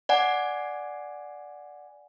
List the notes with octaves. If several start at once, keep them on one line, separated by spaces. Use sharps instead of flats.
D5 F#5 G#5